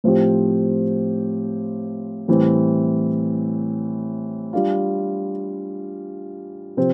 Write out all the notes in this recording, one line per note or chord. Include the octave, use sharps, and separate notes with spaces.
A2 F3 C4 G4
A2 E3 G3 C4
G3 D4 F4
C3 F3 C4